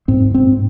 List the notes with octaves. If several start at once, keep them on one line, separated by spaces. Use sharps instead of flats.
G#2 C4
G#2 C4